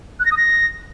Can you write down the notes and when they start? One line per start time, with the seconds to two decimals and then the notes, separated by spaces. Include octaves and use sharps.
0.20 F#6
0.26 A#6
0.32 D#6
0.37 A#6